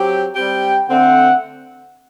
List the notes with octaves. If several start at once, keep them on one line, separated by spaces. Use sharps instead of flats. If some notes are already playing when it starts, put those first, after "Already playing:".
Already playing: F#3 C4 G4
G3 C4 G4 G5
D3 A3 C4 F#5